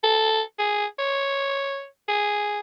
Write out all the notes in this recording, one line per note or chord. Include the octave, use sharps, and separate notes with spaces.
A4
G#4
C#5
G#4